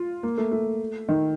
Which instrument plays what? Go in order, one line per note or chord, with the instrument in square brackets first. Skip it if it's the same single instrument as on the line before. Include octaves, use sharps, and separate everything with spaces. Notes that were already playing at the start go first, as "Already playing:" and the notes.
Already playing: [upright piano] F4
A#3
A3
A3
D#3